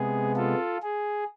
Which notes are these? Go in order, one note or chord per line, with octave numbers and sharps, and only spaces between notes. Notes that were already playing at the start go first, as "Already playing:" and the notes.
Already playing: C3 G#3 B3 G#4
F4 A4
G#4